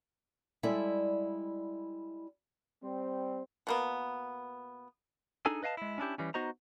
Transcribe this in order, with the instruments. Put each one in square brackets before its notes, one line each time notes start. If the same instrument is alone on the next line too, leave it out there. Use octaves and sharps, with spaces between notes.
[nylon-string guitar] G3 G#3 E4 A4 D5 E5
[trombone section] G3 C4
[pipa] B2 A#3 B3
[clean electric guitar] D4 D#4 G#4 A4 G#5
B4 D#5 F5 G#5 A5
G#3 E4
C#4 D4 E4 G4
E3 G3 C#4
B3 D#4 F#4 C5 D#5 A#5